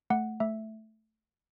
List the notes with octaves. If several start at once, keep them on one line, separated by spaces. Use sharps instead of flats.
A3 F#5
A3 E5